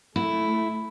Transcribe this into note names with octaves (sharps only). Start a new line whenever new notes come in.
A3 E4